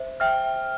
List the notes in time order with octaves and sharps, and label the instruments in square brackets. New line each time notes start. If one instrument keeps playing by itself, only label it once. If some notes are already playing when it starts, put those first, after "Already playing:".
Already playing: [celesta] C5 E5
[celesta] E5 G5 [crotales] F6